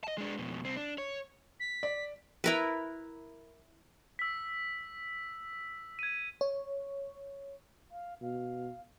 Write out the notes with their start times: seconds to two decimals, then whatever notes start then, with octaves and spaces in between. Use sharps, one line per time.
0.04 D#5 A5
0.18 G#3 D4
0.39 F2 B2
0.64 C2 C4
0.77 D4
0.98 C#5
1.60 B6
1.83 D5
2.44 E4 A#4 B4
4.19 E6 B6
5.99 G#6 D#7
6.41 C#5
7.91 F5
8.21 B2 F5